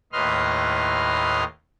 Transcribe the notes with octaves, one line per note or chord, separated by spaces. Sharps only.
D#2 A2 B4 D#5 C6 F6